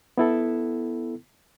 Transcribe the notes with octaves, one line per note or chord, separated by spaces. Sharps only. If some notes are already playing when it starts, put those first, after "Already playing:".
B3 E4 A4